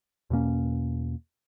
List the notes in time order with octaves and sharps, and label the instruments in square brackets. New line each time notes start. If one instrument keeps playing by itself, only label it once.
[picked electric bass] E2 B2 A#3 C#4